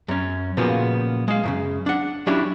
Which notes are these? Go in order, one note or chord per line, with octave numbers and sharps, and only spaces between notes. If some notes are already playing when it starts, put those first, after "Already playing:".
F#2 C#4
A#2 C#3 F3 F#3 A#3 B3
G#3 F5
F#2 A2 C#3
D4 F#5
F#3 C#4 D4 E4 G4 E5